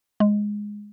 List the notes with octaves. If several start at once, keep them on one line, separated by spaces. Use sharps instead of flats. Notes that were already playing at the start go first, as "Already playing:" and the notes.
G#3